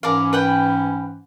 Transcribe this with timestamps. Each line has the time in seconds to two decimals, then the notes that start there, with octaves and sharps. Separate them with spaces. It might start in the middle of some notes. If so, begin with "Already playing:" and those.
0.03 G#2 E3 C#4 A#4 D5 F5
0.33 B4 F#5 G5